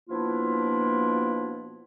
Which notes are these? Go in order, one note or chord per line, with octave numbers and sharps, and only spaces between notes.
B2 F3 A#3 D4 E4 F4